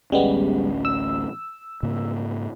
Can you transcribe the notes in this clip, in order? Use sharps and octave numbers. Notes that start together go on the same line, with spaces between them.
A1 D2 G3 G#3 B3 C#4
E6
G#2 C#3 A#3